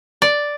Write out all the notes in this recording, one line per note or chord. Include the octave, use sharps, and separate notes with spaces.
D5